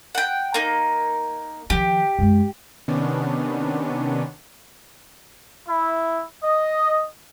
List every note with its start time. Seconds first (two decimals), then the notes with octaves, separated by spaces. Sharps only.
0.15 F#5 G5
0.54 A#3 D#4
1.70 D#3 F3 G4
2.19 F#2 G#3
2.88 C3 D#3 B3 C#4 D4
5.68 E4
6.43 D#5